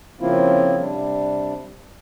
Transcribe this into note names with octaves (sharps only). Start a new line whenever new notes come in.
C#3 F3 A#3 C4 E4 F4
C3 G3 D4